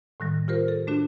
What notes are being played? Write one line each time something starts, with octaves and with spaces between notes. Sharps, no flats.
A2 D#3 G3
F4 G4 A#4 C5
A4
A3 D4 F#4